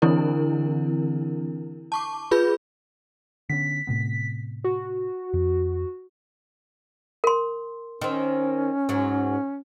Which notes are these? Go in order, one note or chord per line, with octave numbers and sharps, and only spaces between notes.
D3 E3 C4 D4 E4 A#4
A5 C#6 D6
F4 G#4 B4 B5 G6
D3 B3 C#4 B6
A2 C3 B3
F#4
F2
A#4 C6
D#3 C4 C#4
G#2 F#3